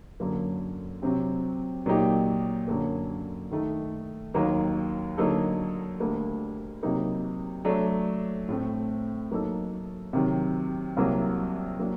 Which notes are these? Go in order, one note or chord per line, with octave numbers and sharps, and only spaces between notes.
F#2 D3 F#3 A#3
C3 F#3 C4 G4
A#2 F#3 A#3 D#4 G4
F#2 D3 F#3 A#3
D#3 A3 D#4
D#2 D#3 F#3 A#3 D#4
D3 F#3 A#3 D#4 A4
D2 D3 G3 A#3
C3 F#3 A#3 D#4
F#3 A3 D4
A2 A3 C4
F#3 A#3 D#4 A4
C3 D#3 F#3
C2 C3 F#3 A#3
F#3 A#3 D4 F#4